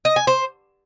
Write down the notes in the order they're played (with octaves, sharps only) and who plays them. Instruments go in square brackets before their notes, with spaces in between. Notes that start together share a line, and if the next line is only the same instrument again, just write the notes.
[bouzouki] D#5
G#5
C5